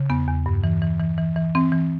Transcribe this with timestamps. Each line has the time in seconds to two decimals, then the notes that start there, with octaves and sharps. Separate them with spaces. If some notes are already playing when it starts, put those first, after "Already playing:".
Already playing: C#3
0.09 E2 B3
0.27 E2
0.46 G2
0.64 E3
0.82 E3
1.00 E3
1.18 E3
1.36 E3
1.55 E3 C4
1.72 E3